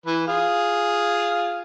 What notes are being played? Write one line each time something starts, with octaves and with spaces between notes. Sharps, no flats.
E3 B4
F4 G#4 F5